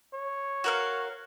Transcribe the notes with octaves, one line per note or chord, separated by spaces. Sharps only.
C#5
F#4 A#4 F5